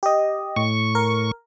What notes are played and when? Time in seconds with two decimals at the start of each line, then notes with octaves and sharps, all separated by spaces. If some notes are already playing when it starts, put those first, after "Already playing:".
0.03 G4 D#5
0.56 A2 C#6
0.95 A#4